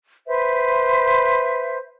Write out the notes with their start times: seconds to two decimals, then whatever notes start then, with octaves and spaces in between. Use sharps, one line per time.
0.27 B4 C5 E5